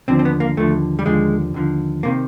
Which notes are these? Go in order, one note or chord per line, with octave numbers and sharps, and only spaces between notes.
D#2 D3 F3 C4
C4
B3
A#3
D#2 D3 F3 A3
G3
D#2 D3 F3 G#3
D#2 D3 F3
C3 D#3 A#3